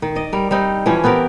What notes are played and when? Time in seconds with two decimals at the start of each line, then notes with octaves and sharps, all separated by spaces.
0.02 D#3
0.15 D5 D#5
0.32 G3 A#4
0.51 G3 C4 D#4
0.86 E3 F3 C#4
1.04 B3 C4 G4 A#4